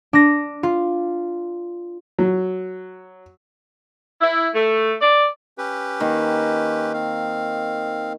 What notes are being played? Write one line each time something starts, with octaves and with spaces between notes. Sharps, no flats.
D4 A#6
F4
F#3
E4
A3
D5
C#4 G4 B4
D#3 A#3
C4 F5